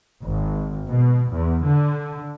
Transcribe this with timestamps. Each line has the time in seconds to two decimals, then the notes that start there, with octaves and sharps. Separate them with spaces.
0.25 G#1
0.89 B2
1.34 E2
1.67 D3